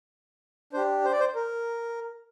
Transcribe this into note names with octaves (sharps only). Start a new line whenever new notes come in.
D4 G4 C5
C5
D5
C5
A#4